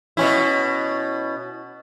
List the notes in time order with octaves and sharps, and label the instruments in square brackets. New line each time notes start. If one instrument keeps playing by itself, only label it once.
[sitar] B2 C#4 E4